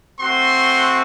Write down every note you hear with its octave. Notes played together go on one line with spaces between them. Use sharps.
A3 C4 F#4 C6